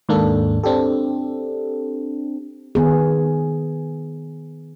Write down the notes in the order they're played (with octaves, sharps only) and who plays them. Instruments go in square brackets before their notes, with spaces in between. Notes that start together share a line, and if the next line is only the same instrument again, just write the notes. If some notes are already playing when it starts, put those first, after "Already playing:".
[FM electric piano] D#2 G#2 A#3 D4 A4
C4 D4 G4 A4
[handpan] D#3 B3 G#4